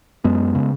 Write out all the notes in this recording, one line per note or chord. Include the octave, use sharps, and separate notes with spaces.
F#2 G#3 B3
C#3